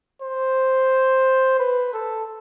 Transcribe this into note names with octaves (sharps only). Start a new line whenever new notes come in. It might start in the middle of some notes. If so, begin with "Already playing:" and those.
C5
B4
A4